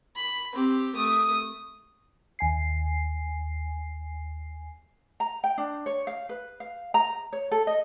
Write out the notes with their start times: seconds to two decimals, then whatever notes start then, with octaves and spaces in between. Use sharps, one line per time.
0.16 B5
0.53 C4 G4
0.95 A3 D#6
2.39 D#2 G#5 C7
5.20 A#5
5.44 G5
5.58 D4
5.86 C#5
6.07 F5
6.29 B4
6.60 F5
6.94 A#5
7.33 C#5
7.52 A4
7.67 D#5